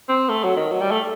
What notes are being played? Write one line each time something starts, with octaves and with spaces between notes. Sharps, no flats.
C4
A3
F#3
D#3
F#3
G3
A3